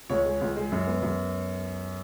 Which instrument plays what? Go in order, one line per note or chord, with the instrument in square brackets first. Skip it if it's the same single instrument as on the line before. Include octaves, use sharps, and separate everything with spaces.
[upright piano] C#2 C#5
G#3
C#2
G#3
F#2
B3
F#2